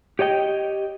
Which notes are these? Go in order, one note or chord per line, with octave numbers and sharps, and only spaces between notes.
G4 C#5 D#5 G5